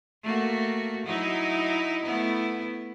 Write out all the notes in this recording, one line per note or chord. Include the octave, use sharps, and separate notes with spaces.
A3 A#3 F#4
F#3 D#4 E4
A3 B3 E4